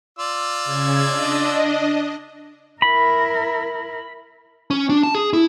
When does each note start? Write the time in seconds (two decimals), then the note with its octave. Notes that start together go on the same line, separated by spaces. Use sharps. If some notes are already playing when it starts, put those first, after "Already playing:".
0.19 F4 D5 E6
0.65 C#3 G#6
1.07 D4 D#5
2.82 E4 A#4 B5
4.70 C#4
4.89 D4
5.03 A5
5.15 G#4
5.33 E4